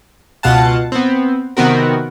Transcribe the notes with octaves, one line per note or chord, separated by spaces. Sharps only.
C#2 B2 F4 F#5 A5
B3 C4
C3 D#3 B3 C4 F#4 A#4